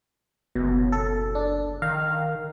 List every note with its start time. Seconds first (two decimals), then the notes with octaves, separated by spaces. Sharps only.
0.55 F#1 B2
0.92 A4
1.35 D4
1.82 D#3 F5